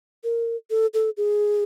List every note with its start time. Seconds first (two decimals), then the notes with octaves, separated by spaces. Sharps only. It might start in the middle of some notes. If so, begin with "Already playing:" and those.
0.24 A#4
0.70 A4
0.94 A4
1.17 G#4